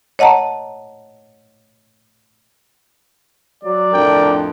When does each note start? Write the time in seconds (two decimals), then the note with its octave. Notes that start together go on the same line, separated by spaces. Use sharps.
0.19 C#5 D#5 F#5 A5 A#5
3.63 F#3 D5
3.93 F2 A2 D4 A#4 G5